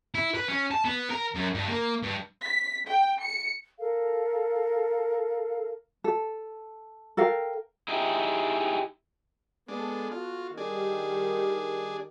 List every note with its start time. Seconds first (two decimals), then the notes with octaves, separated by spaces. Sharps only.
0.15 E4
0.35 B4
0.48 C#4
0.71 A5
0.85 B3
1.11 A#4
1.35 F#2
1.54 G2
1.68 A#3
2.02 G2
2.45 B6
2.87 G5
3.20 C#7
3.78 A4 A#4 F5
6.04 A4
7.17 A4 A#4 F5 G5
7.88 D#4 E4 G4 G#4
9.69 G#3 B3 D4 A4
10.12 F4 F#4
10.57 D#3 G3 D4 G#4